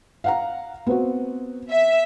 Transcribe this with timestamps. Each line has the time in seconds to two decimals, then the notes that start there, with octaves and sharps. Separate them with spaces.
0.24 F5 F#5 A#5
0.87 B3 C4 F#4
1.69 E5